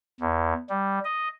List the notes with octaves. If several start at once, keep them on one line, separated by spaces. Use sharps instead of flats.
E2
G3
D#5